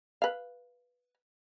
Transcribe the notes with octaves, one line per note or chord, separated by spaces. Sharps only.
B4 F5